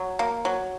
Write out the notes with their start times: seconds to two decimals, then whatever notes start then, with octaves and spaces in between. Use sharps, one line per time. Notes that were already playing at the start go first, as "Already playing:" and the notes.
Already playing: F#3
0.19 A#3
0.45 F#3